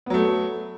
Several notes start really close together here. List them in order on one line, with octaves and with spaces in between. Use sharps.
B3 F#3 A3